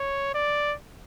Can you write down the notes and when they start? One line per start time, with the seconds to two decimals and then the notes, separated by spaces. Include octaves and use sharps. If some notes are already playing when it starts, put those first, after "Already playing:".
Already playing: C#5
0.34 D5